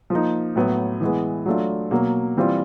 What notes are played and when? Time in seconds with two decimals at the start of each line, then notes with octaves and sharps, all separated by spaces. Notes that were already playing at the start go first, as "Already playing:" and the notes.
0.10 F3 A#3 D#4
0.55 A2 F#3 B3
1.01 E3 G#3 B3
1.46 F#3 A3 D4 F4
1.91 B2 F#3 A#3
2.37 E3 G3 C4 F4